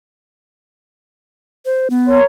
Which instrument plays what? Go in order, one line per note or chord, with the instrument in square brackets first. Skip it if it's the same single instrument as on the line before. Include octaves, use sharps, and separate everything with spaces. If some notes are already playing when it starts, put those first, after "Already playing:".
[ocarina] C5
B3
[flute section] A#4 C#5 C6